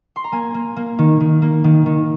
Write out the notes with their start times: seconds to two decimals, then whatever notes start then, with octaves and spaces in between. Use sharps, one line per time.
0.16 C6
0.24 A#5
0.32 A#3 G#5
0.54 A#3
0.76 A#3
0.99 D#3
1.20 D#3
1.42 A#3
1.64 D#3
1.86 D#3